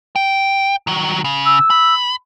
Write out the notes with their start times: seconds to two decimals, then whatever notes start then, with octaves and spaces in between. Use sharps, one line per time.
0.16 G5
0.87 D#3 F#3
1.25 C#3
1.45 E6
1.70 B5